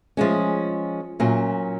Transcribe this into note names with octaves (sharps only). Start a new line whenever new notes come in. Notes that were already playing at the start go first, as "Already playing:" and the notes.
F3 G#3 C#4
A#2 F#3 C#4